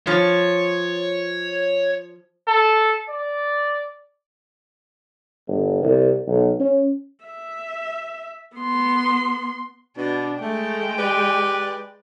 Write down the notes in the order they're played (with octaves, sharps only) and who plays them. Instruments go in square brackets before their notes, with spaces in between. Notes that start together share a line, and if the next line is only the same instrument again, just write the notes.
[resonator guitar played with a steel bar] F3 [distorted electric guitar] C#5
[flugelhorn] A4
D5
[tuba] G1
C2
B1
C#4
[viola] E5
B3 C6
[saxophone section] B2 [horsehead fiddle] D4
[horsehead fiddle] G#3 G5 [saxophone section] A3
[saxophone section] G4 B4 D5